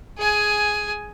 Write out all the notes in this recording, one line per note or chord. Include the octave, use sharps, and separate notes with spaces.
G#4 G#5